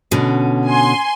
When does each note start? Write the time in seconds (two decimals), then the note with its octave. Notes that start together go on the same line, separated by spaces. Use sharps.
0.11 B2 D3 C#4
0.67 G#5 C6